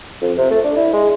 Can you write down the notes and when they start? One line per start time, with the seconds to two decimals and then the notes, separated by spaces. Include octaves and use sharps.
0.22 F2
0.37 C3
0.51 A3
0.64 D4
0.76 E4
0.93 G#3